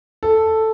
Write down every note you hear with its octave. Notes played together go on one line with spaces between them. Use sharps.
A4